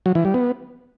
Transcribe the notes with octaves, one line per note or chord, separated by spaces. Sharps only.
F#3
E3
G3
B3